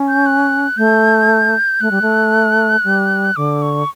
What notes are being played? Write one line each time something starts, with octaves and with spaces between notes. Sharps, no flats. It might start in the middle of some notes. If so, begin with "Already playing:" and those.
Already playing: C#4
G6
F#6
A3 G6
A3 F#6
G3
A3
G3
D3 D6
C#6